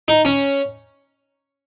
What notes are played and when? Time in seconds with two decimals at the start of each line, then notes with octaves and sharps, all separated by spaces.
0.08 D#4
0.25 C#4